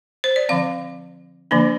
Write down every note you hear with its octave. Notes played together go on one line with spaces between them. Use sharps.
C5
D5
D3 F3 C4 F5
D3 F3 A#3 D4